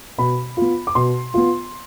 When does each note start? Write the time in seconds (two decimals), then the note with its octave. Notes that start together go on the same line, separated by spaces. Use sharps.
0.18 B2 B5
0.57 B3 F4
0.87 D6
0.95 B2 C6
1.34 B3 F4